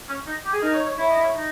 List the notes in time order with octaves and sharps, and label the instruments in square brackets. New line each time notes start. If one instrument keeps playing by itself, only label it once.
[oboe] C#4
D#4
G4
G#4
[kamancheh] D#4 [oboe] A#4
[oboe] C#5
C#5
[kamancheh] E4 [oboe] C#5
[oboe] D#5
C#5
D#4